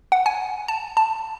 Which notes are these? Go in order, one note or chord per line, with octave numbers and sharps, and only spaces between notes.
F#5
G#5
A5
A5